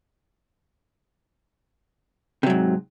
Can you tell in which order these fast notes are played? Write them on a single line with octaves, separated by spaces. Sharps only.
C3 F#3 G#2